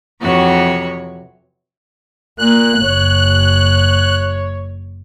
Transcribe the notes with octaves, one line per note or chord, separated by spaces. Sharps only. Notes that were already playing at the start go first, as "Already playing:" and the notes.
F2 C3 E3 F#3 F#4 C#5
A#2 A#3 F#6
F#1 C#5